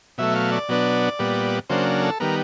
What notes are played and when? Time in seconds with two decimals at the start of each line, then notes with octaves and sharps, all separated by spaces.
0.18 B2 F#3 A3 E5
0.35 F5
0.52 D5
0.69 B2 F#3 B3 D4
1.19 A#2 G3 B3
1.70 C#3 F#3 A#3 D4 C5
2.03 A4
2.20 D#3 G3 B3 A#4